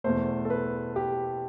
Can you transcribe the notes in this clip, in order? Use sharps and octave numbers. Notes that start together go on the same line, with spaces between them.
E2 B2 A3 C5
A4
B4
G4